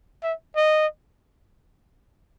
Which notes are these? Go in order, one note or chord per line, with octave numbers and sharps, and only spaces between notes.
E5
D#5